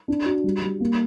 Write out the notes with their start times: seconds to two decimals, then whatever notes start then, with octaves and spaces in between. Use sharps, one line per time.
0.08 D4
0.26 F#4
0.44 G3
0.62 G3
0.80 A#3